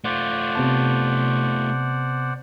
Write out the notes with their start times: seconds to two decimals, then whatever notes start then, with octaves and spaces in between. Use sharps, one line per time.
0.04 A3 F4 C5 D5 F#5
0.55 C3 B3 A5